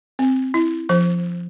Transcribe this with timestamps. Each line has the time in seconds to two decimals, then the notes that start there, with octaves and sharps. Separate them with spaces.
0.19 C4
0.54 E4
0.89 F3 C5